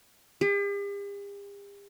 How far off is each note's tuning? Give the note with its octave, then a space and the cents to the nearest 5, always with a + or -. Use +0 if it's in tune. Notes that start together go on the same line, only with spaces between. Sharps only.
G4 +45